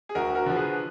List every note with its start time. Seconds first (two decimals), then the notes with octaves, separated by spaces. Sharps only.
0.09 G#4
0.15 D2 F#4 A#4
0.35 F#4 A#4
0.46 D3 F3
0.56 G#4 B4